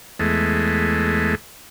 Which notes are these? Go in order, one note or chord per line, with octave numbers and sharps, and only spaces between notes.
E2 G#3 A3